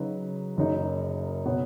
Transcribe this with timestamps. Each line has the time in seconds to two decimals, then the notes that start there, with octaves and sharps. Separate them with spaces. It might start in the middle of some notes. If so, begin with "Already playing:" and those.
Already playing: C#3 F#3 D#4 F#4 B4
0.57 F#1 F#2 C#3 F#3 D#4
1.46 B2 B3 F#4 C#5